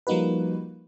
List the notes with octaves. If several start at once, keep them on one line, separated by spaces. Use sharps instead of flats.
F3 G3 A#3 D#4 F#4 B4